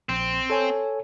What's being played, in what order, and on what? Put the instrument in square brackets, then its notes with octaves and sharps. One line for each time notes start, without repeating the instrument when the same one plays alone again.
[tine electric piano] A#1 [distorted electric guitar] C4
[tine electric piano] A4 C#5 G#5